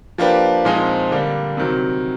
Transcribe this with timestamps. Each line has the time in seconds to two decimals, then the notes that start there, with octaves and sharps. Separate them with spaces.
0.18 F3 A#3 D4 G4 B4
0.65 A#2 F3 G#3 C4 D#4
1.11 D3 G3 A#3 D4
1.57 C3 D#3 F#3